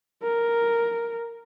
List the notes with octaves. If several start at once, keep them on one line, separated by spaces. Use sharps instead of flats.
A#4